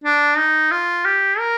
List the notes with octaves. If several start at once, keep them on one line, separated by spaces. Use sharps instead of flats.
D4
D#4
F4
G4
A#4